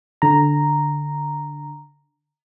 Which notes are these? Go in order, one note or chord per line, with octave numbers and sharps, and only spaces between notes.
D3 A#5